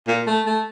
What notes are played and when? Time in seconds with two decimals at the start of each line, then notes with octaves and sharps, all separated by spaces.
0.07 A#2
0.27 A3
0.46 A3